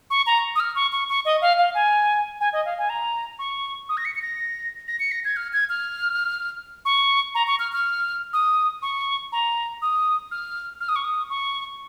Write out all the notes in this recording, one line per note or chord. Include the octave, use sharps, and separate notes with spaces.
C#6
A#5
D#6
F6
C#6
C#6
C#6
D#5
F5
F5
G#5
G#5
D#5
F5
G#5
A#5
C#6
D#6
A#6
C#7
C#7
A#6
A#6
C#7
A#6
G#6
F6
G#6
F6
C#6
A#5
C#6
F6
F6
D#6
C#6
A#5
D#6
F6
F6
D#6
C#6
D#6
C#6